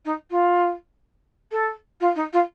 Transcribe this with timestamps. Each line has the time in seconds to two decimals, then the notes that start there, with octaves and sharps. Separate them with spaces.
0.05 D#4
0.30 F4
1.51 A4
2.00 F4
2.15 D#4
2.33 F4